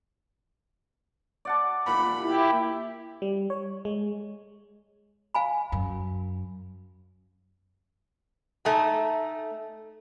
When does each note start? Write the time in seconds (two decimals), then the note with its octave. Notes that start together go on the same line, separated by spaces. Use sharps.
1.45 D5 F#5 A5
1.87 A#2 B5
2.22 E4 G4
3.22 G3
3.50 C#5
3.85 G#3
5.35 F5 G#5 B5
5.72 F#2
8.65 A3 D#4 G#5